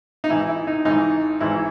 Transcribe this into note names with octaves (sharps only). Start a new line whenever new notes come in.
D#4
G#1 G#2 E3 E4
E4
D#4
G#1 G#2 E3 D#4
G#1 G#2 E3 E4